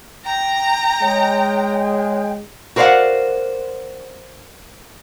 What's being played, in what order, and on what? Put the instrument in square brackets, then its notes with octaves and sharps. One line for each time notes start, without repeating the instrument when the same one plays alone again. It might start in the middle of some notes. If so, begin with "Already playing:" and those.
[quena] G5 [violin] A#5
[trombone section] G#3 [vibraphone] C#5
[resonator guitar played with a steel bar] F#4 A#4 C5 D5 F5 F#5